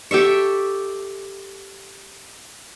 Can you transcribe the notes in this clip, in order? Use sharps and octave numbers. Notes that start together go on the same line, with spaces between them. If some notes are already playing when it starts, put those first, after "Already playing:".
G4 A4 E5 C#6